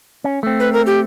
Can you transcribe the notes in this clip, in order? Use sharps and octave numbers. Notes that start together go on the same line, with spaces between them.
C#4
A3 C4
B4
A#4
G4